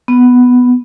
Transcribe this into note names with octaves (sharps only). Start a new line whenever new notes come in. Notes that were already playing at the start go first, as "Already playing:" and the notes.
B3